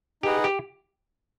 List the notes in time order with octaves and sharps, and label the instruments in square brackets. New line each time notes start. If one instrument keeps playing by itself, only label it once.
[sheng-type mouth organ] D#4 G#4 B4 D#5 F#5 [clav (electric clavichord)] G4
[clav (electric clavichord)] G4